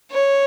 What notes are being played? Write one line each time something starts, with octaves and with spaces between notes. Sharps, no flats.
C#5